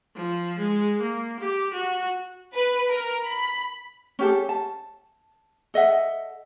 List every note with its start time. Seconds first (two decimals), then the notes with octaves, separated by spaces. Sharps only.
0.16 F3
0.58 G#3
1.01 A#3
1.41 G4
1.74 F#4
2.54 B4
2.90 A#4
3.25 B5
4.19 C#4 G4 A4
4.49 A5
5.74 A4 D#5 E5 F#5